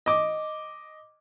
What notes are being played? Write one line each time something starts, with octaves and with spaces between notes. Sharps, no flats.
D#5 D6